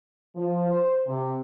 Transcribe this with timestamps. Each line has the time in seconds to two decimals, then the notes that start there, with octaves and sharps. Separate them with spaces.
0.36 F3
0.69 C5
1.07 C3